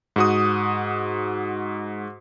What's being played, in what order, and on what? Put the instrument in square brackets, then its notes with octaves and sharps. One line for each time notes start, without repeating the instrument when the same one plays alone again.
[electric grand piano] G#2 F#4 D#6